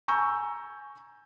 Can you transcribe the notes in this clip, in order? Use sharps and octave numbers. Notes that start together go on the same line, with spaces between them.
G#5 A#5 C#6 E6 G6